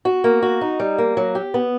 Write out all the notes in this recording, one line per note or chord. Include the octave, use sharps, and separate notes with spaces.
F#4
A#3
F#4
D#4
G3
A#3
F#3
G4
B3